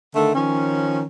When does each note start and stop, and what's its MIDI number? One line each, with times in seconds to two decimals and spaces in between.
0.15 0.32 50
0.15 0.32 51
0.15 0.32 57
0.35 1.04 51
0.35 1.04 53
0.35 1.04 61